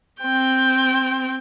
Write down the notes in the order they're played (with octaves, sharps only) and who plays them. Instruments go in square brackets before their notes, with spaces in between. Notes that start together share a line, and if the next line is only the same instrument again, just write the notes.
[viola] C4 G5